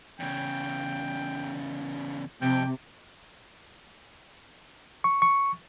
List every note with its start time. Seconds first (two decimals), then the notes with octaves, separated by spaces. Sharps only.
0.20 E2 C#3 G5
2.42 F2 C3 G5
5.04 C#6
5.22 C#6